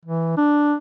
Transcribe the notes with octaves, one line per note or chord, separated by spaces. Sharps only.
E3
D4